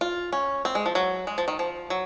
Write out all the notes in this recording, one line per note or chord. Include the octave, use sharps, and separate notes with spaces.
F4
C#4
C4
G#3
F3
F#3
G#3
F3
D#3
F3
F#3